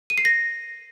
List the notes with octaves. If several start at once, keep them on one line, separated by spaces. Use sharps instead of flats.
D#7
C7
A#6